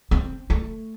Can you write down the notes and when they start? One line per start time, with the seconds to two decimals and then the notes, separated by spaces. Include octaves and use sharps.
0.11 C4
0.50 A3